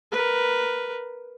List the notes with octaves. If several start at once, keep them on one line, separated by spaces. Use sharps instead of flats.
A#4 B4